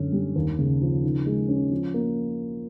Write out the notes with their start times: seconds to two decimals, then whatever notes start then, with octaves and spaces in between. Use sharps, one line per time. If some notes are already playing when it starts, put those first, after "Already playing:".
Already playing: F#2 D3 C#4
0.12 G3
0.36 D#2
0.59 C#3
0.81 F3
1.03 D#3
1.26 G#3
1.48 C#4
1.71 F3
1.94 A#3